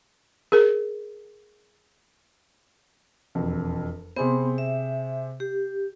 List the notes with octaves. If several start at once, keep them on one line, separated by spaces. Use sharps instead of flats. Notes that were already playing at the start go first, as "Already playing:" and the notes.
G#4 A#4
E1 F2
C3 B3 G#4 C5 C6
E5
G4